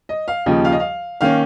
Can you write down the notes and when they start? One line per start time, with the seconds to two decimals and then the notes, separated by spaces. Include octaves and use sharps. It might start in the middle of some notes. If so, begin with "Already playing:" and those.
0.09 D#5
0.28 F5
0.46 D#2 C#3 F3 D#5
0.65 F5
0.72 D#5
0.80 F5
1.21 D#3 A#3 C#4 F5